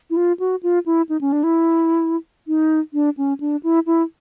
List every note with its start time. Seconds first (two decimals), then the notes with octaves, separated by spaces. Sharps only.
0.10 E4
0.17 F4
0.40 F#4
0.63 F4
0.86 E4
1.09 D#4
1.21 C#4
1.32 D4
1.44 E4
2.47 D#4
2.94 D4
3.17 C#4
3.40 D4
3.63 E4
3.86 E4